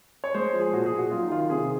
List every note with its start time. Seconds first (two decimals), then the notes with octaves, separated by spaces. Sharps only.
0.24 C#5
0.34 G#3 C5
0.47 C5
0.53 F3
0.60 G#4
0.73 A#2 F#4
0.85 G#4
0.92 A#2
0.98 F#4
1.11 F#3 F4
1.22 D#4
1.30 D#3 F4
1.41 F4
1.50 C3 G#4